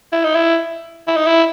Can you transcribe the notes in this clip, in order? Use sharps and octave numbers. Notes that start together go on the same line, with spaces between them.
E4
D#4
E4
E4
D#4
E4